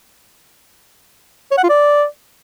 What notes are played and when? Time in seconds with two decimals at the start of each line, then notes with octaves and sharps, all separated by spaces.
1.51 C#5
1.57 F#5
1.63 F4
1.69 D5